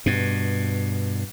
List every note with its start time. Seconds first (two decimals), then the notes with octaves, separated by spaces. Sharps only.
0.06 G2 B2